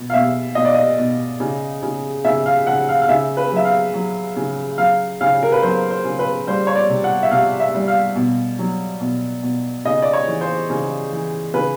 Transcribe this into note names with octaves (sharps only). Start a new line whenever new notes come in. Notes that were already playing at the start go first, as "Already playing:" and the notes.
Already playing: B2
F5
B2 E5
B2 D#5
D5
D#5
B2
C#3
C#3
C#3 E5
F5
C#3 F#5
F5
F5
C#3 E5
B4
F#3 E5
F5
F#3
C#3
F#3 F5
C#3 F5
A#4
B4
F#3 C5
C5
C#3
B4
G3 C5
C#5
D5
C3
F#5
E5
C3 F5
E5
G3
F5
B2
F#3
B2
B2
C#3 D#5
D5
C#5
E3
C5
C#3
E3
C#3 B4